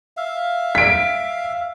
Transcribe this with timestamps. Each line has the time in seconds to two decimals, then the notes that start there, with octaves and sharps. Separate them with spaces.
0.17 E5 F5
0.75 B6 D7